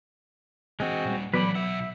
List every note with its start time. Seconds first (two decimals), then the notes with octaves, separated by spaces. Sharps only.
0.80 E3 G#3 C4 F#4 D#5
1.04 A#2 G3
1.34 E3 F#3 B3 A4 B4 D5 B5
1.55 B1 E5 F#5